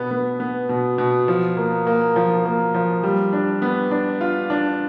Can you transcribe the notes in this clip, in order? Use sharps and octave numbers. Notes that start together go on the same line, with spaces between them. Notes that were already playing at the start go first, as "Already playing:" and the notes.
Already playing: B2 B3
B3
B3
B2
B2
F3
A#3
A#3
F3
A#3
F3
G3
D4
B3
D4
F4
D4